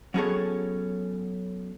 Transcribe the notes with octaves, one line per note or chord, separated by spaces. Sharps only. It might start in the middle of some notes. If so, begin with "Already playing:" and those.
F#3 B3 C#4 G#4 A4 C#5